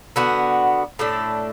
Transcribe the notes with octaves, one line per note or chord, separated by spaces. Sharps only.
D3 B3 F#4
A2 A3 D4 A4